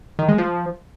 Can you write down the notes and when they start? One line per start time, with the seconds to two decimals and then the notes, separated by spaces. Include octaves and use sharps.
0.19 D#3
0.28 G#3
0.38 F3